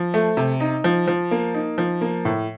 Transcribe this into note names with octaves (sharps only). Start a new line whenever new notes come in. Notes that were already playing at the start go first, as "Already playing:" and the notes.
Already playing: F3
A3
C3
D#4
F3
F3
A#3
D#4
F3
A#3
A2